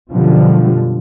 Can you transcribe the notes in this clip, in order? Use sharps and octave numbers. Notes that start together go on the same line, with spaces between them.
F#2 B2 D3 F3 G3